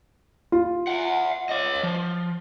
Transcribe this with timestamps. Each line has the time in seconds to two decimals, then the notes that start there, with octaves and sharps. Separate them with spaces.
0.52 F4
0.88 E5 F#5
1.49 C#5 D#5
1.83 F3